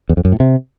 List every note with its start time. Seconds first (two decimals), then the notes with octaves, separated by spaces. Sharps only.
0.09 E2
0.17 F2
0.25 F#2
0.32 A2
0.40 C3